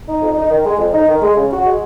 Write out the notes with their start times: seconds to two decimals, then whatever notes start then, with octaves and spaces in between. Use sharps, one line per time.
0.09 D#4
0.22 F2
0.37 D#4
0.50 D#3
0.66 G#3
0.79 F2
0.93 D#4
1.08 D#3
1.22 G#3
1.37 C#3
1.51 F#4
1.65 G#3